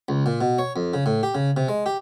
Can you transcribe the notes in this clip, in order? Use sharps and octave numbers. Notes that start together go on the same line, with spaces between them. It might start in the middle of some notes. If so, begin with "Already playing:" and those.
C#2
A#2
B2
C#5
F2
C#3
A2
G4
C#3
C3
G#3
G4